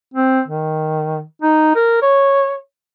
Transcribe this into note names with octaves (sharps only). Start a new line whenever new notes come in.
C4
D#3
D#4
A#4
C#5